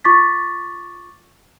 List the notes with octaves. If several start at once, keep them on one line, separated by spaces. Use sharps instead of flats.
F4 C#6 D6 A6 B6